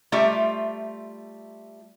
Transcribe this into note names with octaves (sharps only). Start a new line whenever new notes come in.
G3 A3 F4 E5